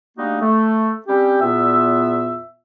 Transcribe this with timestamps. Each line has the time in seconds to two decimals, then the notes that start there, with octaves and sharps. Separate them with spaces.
0.17 G3 A3 A#3 D4 D#4 F#4
0.40 A3
1.07 G3 C4 C#4 G4
1.41 E2 A#2 B3 F4 E5